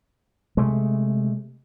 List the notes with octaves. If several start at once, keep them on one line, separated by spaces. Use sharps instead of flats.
C3 G#3 A3